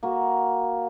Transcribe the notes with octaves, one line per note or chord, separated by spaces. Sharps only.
A#3 F#4